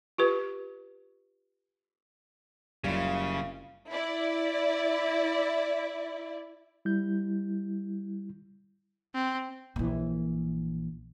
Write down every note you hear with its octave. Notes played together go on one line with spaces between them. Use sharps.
F4 G4 B4
F#1 C#3 G3 F4 F5
E4 D5
G3 E4 G6
C4
A#1 E3